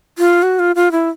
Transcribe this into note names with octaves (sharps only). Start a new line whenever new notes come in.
F4
F#4
F4
F4
E4